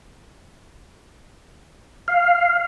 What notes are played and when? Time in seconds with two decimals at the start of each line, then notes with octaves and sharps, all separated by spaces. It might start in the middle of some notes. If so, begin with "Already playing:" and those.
2.08 F5